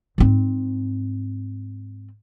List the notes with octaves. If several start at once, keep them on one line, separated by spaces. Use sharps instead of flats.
G#2 C4